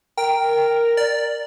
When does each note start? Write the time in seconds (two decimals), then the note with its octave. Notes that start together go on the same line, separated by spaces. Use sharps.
0.17 A#4 G5
0.97 D5